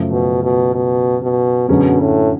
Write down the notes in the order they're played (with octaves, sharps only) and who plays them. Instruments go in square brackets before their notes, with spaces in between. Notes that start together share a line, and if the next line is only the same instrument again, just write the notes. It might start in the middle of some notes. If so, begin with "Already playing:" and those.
Already playing: [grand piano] F#2 C#3 F3 A3
[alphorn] B2
B2
B2
B2
[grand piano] F#2 D3 F#3 C#4 G#4 [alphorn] B2
[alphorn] A2